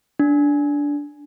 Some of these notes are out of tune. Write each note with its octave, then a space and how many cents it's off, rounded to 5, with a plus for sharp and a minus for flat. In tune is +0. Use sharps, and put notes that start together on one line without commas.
D4 -15